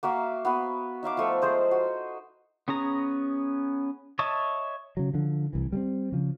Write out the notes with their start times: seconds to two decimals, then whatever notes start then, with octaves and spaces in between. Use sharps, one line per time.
0.03 A#3 F#4 E5 F5
0.45 B3 F#4 B4
1.03 D#4 E5 F5 D6
1.17 F3 A3 C#6
1.42 G#3 A4 C5 D#5
1.71 F#4
2.68 B3 C#4 G#4 A#5
4.19 C#5 D#5 E5 A5
4.97 C#3 F#3
5.13 D3 F3
5.53 C2 E3
5.72 G3 G#3 C4
6.12 C#3 F3